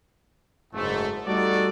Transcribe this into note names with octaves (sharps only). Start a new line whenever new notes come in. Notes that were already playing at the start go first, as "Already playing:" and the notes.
F#1 G#2 A3
G3 A3 D#4 F#4 A4 D5